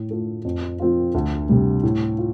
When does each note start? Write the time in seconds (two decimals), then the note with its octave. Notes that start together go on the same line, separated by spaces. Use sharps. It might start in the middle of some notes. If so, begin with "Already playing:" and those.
Already playing: A2
0.10 A3 F4
0.45 F2
0.80 F3 C4 F4
1.14 D2
1.49 C3 G3
1.83 A2
2.18 F4